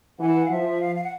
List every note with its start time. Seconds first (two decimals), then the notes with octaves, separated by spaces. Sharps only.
0.19 E3 F#5
0.45 F5
0.50 F3 E5
0.81 F5
0.96 F5
1.04 F#5